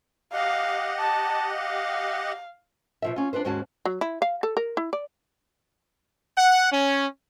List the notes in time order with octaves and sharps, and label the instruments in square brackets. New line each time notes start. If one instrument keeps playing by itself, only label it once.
[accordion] G4 D#5 F#5 [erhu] F5
[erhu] A5
F5
[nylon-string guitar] B2 F3 E5
C#4 F4
D4 F4 B4 C5
D#2 G#2 G#3 C#4 F#4 A5
[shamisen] F#3
E4
F5
A4
A#4
E4
D5
[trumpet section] F#5
C#4